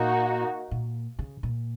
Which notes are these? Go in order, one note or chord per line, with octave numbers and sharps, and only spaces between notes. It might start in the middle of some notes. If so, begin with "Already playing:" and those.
Already playing: A#2 A#3 D#4 F#4
A#2
C#3
A#2